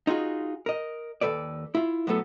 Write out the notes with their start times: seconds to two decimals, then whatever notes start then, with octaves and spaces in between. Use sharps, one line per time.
0.07 D#4 F4 F#4 G#4
0.66 A#4 D#5
1.21 D#2 D#3 A4 B4 D5
1.75 E4 F4
2.07 A2 F#3 B3 A4